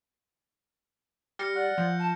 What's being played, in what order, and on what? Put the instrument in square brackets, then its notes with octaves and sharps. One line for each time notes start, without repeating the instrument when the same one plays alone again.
[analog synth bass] G3 [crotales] F6 A#6 C#7
[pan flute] D5 [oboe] F#5
[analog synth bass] F3 [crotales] G6
[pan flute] A5